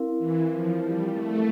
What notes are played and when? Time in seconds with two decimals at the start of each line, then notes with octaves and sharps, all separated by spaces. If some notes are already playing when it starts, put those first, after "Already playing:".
Already playing: C4 E4 A#4 F5
0.19 E3
0.49 F3
0.80 G3
1.11 A3